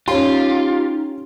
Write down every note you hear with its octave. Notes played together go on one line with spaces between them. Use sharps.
C#4 D#4 F4 G4 C6